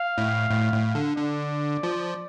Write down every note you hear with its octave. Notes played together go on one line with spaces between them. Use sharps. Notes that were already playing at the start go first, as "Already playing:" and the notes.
Already playing: F5
A2
A2
A2
D3
D3 D5
F3